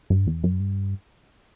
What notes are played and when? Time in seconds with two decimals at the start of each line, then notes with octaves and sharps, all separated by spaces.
0.10 G2
0.27 E2
0.44 F#2
0.60 G2